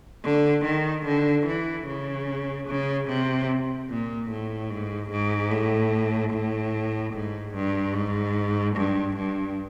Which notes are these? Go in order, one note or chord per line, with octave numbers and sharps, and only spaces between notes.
D3
D#3
D3
E3
C#3
C#3
C3
A#2
A2
G#2
G#2
A2
A2
G#2
G2
G#2
G2
G2